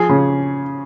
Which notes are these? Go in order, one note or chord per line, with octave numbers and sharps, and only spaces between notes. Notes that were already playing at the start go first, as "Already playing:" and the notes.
Already playing: F3 G#4
C#3